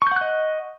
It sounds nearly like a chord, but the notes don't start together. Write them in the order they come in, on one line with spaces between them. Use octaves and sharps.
C#6 G6 F#5 F#6 D#5